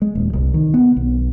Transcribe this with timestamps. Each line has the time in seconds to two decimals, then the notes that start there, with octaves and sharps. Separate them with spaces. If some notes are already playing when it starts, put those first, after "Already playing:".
0.02 G#3
0.15 D#1
0.33 C2
0.54 D#3
0.74 B3
0.96 B1